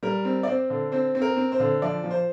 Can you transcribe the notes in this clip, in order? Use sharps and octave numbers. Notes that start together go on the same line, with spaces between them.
G3 A#4
C4
D5
C4 C5
D3
C4 C5
C4
A#4
C4
C5
D3
F3 D5
F3
C5